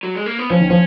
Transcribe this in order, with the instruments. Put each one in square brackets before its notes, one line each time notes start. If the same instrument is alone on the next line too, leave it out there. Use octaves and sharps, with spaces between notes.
[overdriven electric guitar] F#3
G#3
A#3
B3
[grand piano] F3 [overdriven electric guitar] C#4
[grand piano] D#3
[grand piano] F3 [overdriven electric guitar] C#4